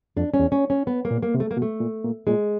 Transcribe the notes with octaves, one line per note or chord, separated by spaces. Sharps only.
F2 D4
C#4
E2
C#4
C#4
B3
A#3
A#2
A#3
C3
A3
A#3
B2
A3
A#2
A#2
A#2 G#3